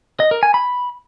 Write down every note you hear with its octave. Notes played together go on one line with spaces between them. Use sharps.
D#5
A#4
G#5
B5